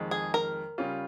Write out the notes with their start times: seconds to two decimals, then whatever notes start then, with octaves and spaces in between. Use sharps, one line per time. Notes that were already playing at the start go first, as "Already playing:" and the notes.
Already playing: F2 D#3 G#3
0.11 G#4
0.34 A#4
0.78 C#3 G3 C#4 F4